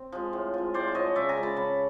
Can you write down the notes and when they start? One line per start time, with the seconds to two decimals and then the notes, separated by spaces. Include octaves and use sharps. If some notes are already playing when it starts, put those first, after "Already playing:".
Already playing: C4
0.12 F3 G#3
0.33 A2
0.54 F3 G#3
0.74 A2 C5 D5
0.94 F3 G#3 C#5 D#5
1.15 C#3 D5 E5
1.29 G#5 A#5
1.36 F3 G#3 C#4
1.43 A5 B5
1.56 C#3 A5 B5